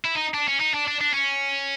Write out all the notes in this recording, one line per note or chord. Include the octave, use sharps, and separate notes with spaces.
E4
D#4
D4
C#4
D#4
D4
D4
D4
C#4